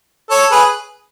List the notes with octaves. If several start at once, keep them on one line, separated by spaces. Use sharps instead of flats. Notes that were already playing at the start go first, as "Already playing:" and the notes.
A4 C#5
G#4 B4